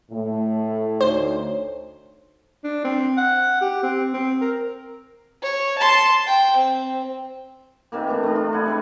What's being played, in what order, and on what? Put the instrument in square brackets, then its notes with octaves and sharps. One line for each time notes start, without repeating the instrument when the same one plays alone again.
[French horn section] A2 A3
[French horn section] D2 D#4 C#5 [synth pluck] C5
[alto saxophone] D4
C4
F#5
G4
C4
C4
A#4
[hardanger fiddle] C#5
A5 C6
G5
C4
[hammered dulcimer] C3 D#3 E3 A#3
A2 E3 D4
A3 D4
F4
E4 F#5 G#5
C3 G#3 B4